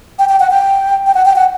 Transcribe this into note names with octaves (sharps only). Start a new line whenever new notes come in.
G5
G5
F#5
G5
G5
F#5
G5
F#5